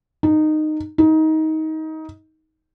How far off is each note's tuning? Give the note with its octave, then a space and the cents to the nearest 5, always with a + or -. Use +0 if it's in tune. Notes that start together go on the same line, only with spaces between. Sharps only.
D#4 -15
D#4 +20